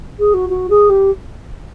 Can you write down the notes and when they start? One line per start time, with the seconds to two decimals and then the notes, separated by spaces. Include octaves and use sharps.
0.19 G#4
0.34 F#4
0.50 F#4
0.70 G#4
0.90 G4